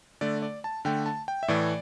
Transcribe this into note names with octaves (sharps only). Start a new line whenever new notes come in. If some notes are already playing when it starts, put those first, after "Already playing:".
D3 A3 D5
D5
A5
D3 A3 G5
A5
G5
E5
A2 E3 A3 D5